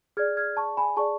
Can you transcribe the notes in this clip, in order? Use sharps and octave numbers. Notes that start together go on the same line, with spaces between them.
G#4 D5 F6 G#6
F6 G#6
A5 C#6
G#5 B5
G#4 D5 A5 C#6